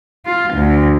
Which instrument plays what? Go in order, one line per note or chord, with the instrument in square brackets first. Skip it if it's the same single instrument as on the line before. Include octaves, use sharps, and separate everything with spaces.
[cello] F4
D2